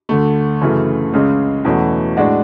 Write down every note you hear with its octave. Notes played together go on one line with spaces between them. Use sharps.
D2 D3 A3
F#2 C#3 E3 A3
C#2 C#3 G#3 C#4
E2 B2 F#3 A3 C#4
A2 G#3 D4 F#4